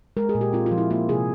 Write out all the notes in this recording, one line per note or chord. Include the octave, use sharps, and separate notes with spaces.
G#3 A#4
G#4
A#2
G4
C4 F4
F4
F3
E4
A#3 F4
C3 G#4